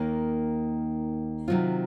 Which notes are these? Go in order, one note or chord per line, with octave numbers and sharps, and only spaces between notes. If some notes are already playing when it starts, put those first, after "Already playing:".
Already playing: D#2 D#3 A#3
C3 D#3 F#3 C4 F4